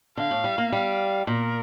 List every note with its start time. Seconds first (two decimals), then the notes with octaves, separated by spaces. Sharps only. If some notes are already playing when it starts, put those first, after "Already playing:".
0.17 D3 F5
0.31 A2
0.44 G3
0.58 A#3
0.72 G3 F5
1.27 A#2 A#4